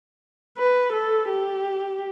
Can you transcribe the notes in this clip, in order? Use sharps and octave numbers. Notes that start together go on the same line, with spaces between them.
B4
A4
G4